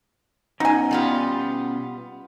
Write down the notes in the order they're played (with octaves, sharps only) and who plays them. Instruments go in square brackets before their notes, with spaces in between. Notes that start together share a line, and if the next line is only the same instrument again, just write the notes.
[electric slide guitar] B2 C#4 F#5 [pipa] D#4 G#5
[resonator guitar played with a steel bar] G3 B3 F4